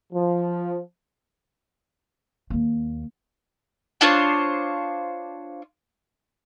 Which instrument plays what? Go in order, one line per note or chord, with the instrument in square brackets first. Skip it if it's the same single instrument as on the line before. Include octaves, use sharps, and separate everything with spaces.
[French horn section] F3
[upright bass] D#2 A#3
[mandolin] D4 F4 C5 C#5